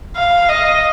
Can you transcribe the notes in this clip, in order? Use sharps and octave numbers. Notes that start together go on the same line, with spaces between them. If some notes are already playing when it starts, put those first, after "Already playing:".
F5
D#5